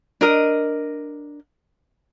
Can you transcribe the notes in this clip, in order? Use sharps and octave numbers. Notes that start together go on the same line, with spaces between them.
D4 A#4 D#5